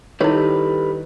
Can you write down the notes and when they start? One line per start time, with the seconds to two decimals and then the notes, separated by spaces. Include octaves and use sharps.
0.21 D#3 G3 E4 G4 A4 B4 C#5